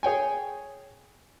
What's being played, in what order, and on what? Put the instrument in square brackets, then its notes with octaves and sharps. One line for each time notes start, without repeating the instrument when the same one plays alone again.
[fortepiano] G#4 C#5 G5 G#5